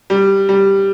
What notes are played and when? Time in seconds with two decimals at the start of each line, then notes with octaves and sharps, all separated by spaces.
0.10 G3
0.49 G3